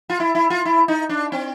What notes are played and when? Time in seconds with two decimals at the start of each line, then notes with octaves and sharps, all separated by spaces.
0.10 F4
0.20 E4
0.35 E4
0.50 F4
0.65 E4
0.88 D#4
1.09 D4
1.32 C4